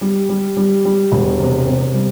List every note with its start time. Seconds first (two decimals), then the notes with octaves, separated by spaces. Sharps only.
0.01 G3
0.29 G3
0.57 G3
0.85 G3
1.12 E1
1.40 C3
1.67 C3
1.94 G3